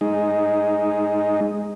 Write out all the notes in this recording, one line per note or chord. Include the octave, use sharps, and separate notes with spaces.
G#3 D#4